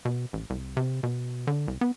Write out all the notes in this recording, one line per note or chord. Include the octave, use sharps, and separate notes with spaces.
B2
A1
C2
C3
B2
D3
C2
B3